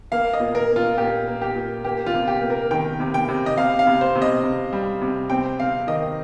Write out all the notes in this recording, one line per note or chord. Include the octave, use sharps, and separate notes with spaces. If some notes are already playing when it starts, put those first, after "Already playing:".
A#3 F5
D#5
A#2
A#4
A#3
F4
A#2 G4
A#3
G4
A#2
A#3 G4
F4
C3
G4
A#3
A#4
D#3 G5
C3
G5
C3
D#5
C3 F5
F5
C3
C5
C3
D#5
C3
G3
C3
C4 G5
C4 F5
D#3 D#5